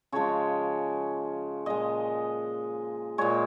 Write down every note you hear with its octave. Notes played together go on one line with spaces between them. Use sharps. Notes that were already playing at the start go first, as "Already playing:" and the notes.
C#3 F3 G#3 C#5
A#2 G#3 D#5
A#2 G#3 C#5